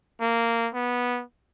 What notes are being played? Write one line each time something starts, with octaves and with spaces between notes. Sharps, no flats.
A#3
B3